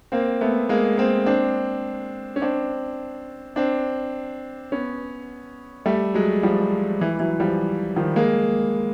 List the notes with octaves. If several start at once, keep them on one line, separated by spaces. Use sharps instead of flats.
A#3 C4
A3 B3
G#3 A#3
A#3 C4
C4 D4
C#4
C4 D4
C4 D4
B3 C#4
G3 A3
F#3 G#3
F3 G3
E3
E3 F#3
F3 G3
D#3 F3
G#3 A#3